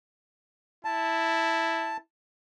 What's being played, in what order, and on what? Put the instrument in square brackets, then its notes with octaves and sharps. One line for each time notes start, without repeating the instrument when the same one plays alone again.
[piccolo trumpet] E4 [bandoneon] A5